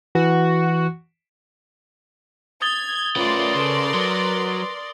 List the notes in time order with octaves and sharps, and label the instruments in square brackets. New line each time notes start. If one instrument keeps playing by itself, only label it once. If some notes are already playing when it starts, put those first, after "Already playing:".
[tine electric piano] E3 [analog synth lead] F#4
[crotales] D#6 A6 G7 [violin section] G#6
[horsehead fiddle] A3 F4 [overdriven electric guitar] C#4 B4 [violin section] A#4 D5 C6
[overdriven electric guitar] C#3 [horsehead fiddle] A4 B4
[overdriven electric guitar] F#3 [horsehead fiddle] B4